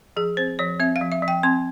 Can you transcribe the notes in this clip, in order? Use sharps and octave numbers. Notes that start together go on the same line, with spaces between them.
F3 G#4
C4 C5
F3 C#5
C4 E5
F5
F3
E5
F3
G5
C4 C6